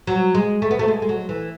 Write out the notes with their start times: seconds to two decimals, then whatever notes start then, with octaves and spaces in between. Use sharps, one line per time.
0.07 F#3
0.35 G#3
0.62 A3
0.71 B3
0.79 A3
0.88 G#3
1.02 G#3
1.09 F#3
1.29 E3